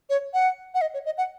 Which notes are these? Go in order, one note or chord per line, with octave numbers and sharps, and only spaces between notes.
C#5
F#5
F#5
D#5
C#5
D#5
F#5